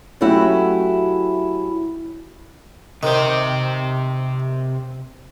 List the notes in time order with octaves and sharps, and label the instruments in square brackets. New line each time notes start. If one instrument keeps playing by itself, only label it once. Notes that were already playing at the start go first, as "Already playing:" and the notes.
[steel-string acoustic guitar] F#3 A3 C#4 E4 F#4 G4
[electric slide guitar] C3 C5 [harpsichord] D#3